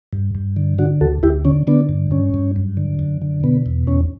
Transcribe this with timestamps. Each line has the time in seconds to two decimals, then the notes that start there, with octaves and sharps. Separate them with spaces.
0.13 G2
0.35 G2
0.56 D3
0.78 D3 D4 F#4
1.01 D2 F#4 A4
1.23 D2 E4 G4
1.45 D3 C#4
1.67 D3 B3 D4
1.89 G2
2.11 G2 C#4
2.34 G2
2.56 F#2
2.77 D3
2.99 F#2
3.22 D3
3.44 B2 B3
3.66 E2
3.87 E2 C#4